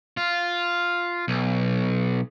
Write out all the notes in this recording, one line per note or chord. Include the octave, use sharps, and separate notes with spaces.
F4
B1